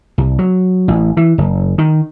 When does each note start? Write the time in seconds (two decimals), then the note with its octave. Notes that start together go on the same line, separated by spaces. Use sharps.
0.18 C2
0.39 F#3
0.88 A1
1.17 E3
1.38 F#1
1.78 D#3